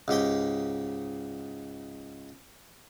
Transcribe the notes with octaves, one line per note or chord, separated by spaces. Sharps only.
C#2 G#2 G4 G5